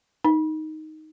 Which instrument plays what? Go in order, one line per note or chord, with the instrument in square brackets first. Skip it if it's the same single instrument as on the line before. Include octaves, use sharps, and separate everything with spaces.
[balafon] D#4